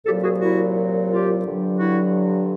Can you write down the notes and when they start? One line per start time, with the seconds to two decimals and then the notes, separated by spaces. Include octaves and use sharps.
0.06 C2 A#2 F#3 G4 A4
0.23 F#4 G#4
0.40 E4 F#4
1.09 F4 G4
1.44 G2 D3 F#3
1.78 E4 F#4